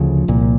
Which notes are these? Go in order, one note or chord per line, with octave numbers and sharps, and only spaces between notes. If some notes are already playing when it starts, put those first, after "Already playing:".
Already playing: D2 C#3 F3
C2 A#2